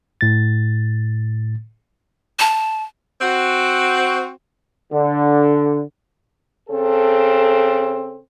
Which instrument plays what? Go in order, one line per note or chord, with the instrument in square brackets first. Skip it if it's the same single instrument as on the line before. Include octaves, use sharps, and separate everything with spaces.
[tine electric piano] A2 A6
[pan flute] A5
[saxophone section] C4 F#4
[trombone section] D3
[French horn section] C#3 C4 A4